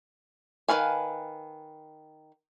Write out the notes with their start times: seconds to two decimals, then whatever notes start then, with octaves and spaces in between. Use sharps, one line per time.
0.68 D#3 F#4 B4 F5 G#5